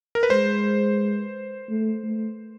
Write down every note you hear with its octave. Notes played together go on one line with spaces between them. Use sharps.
A#4
B4
G#3 C5
A3
A3